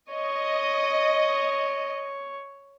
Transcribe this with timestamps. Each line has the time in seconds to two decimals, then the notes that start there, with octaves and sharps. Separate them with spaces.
0.12 C#5 D#5